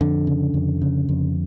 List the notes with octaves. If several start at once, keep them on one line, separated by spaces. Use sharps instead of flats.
F2 D3
C#3
F2
C#3
F2